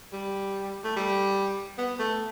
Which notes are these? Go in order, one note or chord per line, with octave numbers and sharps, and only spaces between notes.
G3
A3
G3
B3
A3